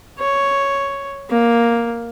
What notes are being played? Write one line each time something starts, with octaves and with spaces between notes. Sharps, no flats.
C#5
A#3